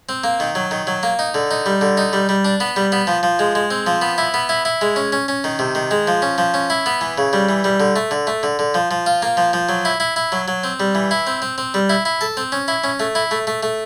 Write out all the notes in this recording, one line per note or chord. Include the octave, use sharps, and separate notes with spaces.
C4
A#3
D#3
F#3
D#3
F#3
A#3
D#4
D3
D#4
G3
D3
D#4
G3
G3
D4
B3
G3
B3
F3
F3
G#3
G#3
C4
F3
B3
E4
B3
E4
E4
G#3
C#4
C#4
C#4
D#3
C3
D#3
G#3
F3
C#4
F3
C#4
E4
B3
E3
C#3
G3
E3
G3
D3
A3
D3
A3
D3
D3
F3
F3
F4
A#3
F3
F3
F#3
E4
E4
E4
F#3
F#3
C4
G3
E3
E4
C4
C4
C4
G3
E4
E4
A4
C4
C#4
E4
C#4
A3
E4
A3
A3
A3